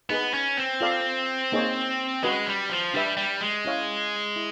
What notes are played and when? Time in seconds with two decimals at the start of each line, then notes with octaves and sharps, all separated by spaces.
0.10 B3 D#4 G#4 B4
0.34 C#4
0.57 C4
0.81 F4 A4 D5 F5
1.52 A#3 D#4 G#4 C#5
2.23 G#3 C#4 F#4 B4 D#5
2.47 G3
2.70 F3
2.94 G3 D4 G4 B4 E5
3.17 G3
3.41 G#3
3.65 C#4 E4 G#4 C#5 F5
4.36 E4